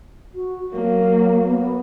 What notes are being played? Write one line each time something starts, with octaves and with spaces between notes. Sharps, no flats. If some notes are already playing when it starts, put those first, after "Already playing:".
F#4
F#3 A#3 A#4
B3